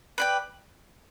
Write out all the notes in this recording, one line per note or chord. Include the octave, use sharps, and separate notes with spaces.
B4 D5 G5